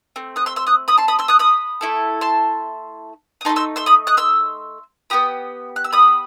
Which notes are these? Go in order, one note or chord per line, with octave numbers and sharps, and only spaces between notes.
A3 C4
D#6 F#6
C6 E6
C6 E6
D#6 F#6
B5 D#6
A5 C6
B5 D#6
C6 E6
D#6 F#6
B5 D#6
A3 E4 A4
A5 C6
D#6
A3 C4 D#4 A5 C6
C6 E6
C6 E6
B5 D#6
D#6 F#6
C6 E6
B3 E4 G4 B5 D#6
F#6
E6
B5 D#6